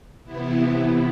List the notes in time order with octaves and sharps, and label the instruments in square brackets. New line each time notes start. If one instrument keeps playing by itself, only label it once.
[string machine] C3 E3 B3 E4